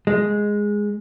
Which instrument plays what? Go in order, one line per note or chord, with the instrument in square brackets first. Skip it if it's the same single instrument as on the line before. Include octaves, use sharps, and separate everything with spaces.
[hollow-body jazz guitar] G#3